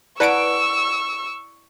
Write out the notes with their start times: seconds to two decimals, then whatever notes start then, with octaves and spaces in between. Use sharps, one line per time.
0.20 E4 B4 D5 F#5 A5 C#6 E6 D7